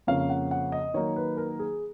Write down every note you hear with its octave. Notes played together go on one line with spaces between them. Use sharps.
F2 C#3 F3 A#3 C#4 F5
F#5
F#5
D#5
D#3 F#3 A#3 D#4 C#5
B4
A#4
G#4